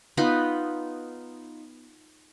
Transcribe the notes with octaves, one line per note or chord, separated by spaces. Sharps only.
B3 D#4 F4 B4